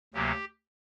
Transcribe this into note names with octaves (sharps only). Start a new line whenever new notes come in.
D2 C3 F#3 A#3 G4